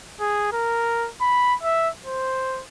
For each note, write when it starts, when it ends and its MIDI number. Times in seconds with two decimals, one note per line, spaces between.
0.20 0.49 68
0.53 1.09 70
1.21 1.55 83
1.63 1.89 76
2.06 2.63 72